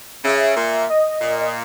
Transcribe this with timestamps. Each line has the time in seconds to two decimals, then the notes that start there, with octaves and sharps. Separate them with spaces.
0.24 C#3 E5
0.57 A#2
0.90 D#5
1.22 A#2